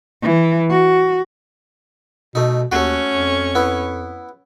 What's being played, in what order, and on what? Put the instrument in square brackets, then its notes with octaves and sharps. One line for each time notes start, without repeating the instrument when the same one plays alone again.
[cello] E3
F#4
[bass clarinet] B2 [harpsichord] A3 D#4
[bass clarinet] D#2 [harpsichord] A3 F#4 [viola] C#4 C#6
[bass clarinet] F2
[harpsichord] B3 E4